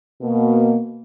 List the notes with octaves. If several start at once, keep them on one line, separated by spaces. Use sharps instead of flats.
B2 A#3